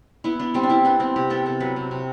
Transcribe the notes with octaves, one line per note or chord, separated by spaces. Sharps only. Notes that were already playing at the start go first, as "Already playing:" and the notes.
B3 E4
B3 D4
G3 C4
D4
G3 E4
B3 D4
G3 C4
C3 G4
B3 A4
C3 A4
F#3 B4
C3
C3